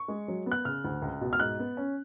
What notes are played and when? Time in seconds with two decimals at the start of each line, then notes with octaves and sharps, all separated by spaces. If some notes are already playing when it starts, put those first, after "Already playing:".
Already playing: C#6
0.08 G#3
0.28 F#3
0.46 B3
0.52 F#6
0.65 C#3 F6
0.84 D2
1.02 C#2
1.21 B2
1.33 F6
1.40 G#2 F#6
1.59 B3
1.77 C#4